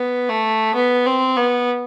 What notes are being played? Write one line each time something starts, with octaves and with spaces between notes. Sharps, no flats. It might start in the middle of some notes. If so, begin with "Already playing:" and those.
Already playing: B3
A3
B3
C4
B3